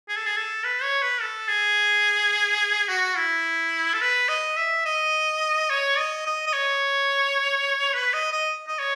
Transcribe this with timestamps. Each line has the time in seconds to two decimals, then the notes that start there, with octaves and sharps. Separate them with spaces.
0.09 G#4
0.16 A4
0.26 G#4
0.37 A4
0.64 B4
0.83 C#5
1.02 B4
1.21 A4
1.48 G#4
2.88 F#4
3.17 E4
3.94 A4
4.01 B4
4.29 D#5
4.57 E5
4.85 D#5
5.70 C#5
5.98 D#5
6.26 D#5
6.47 D#5
6.53 C#5
7.94 B4
8.14 D#5
8.32 D#5
8.67 D#5
8.79 C#5